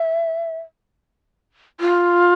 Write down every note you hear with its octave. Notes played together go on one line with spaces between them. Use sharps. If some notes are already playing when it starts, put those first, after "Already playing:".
Already playing: E5
F4